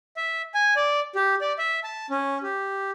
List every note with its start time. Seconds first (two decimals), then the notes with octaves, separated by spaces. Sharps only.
0.17 E5
0.54 G#5
0.76 D5
1.15 G4
1.41 D5
1.59 E5
1.84 A5
2.10 C#4
2.43 G4